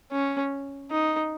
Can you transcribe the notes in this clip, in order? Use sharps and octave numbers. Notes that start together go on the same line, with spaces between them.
C#4
D#4